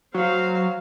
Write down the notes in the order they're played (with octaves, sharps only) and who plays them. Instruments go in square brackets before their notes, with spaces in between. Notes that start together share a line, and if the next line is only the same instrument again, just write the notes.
[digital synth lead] F#3 [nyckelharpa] C5 F5